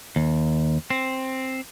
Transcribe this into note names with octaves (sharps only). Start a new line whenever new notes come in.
D#2
C4